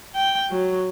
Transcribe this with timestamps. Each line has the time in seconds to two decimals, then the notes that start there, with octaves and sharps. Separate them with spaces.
0.15 G5
0.51 F#3